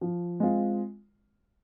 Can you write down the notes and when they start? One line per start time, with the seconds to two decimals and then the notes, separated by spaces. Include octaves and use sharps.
0.01 F3
0.40 G#3 C4 F4